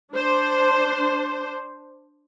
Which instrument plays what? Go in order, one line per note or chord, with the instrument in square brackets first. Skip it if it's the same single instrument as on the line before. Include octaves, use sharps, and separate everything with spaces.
[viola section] D4 C5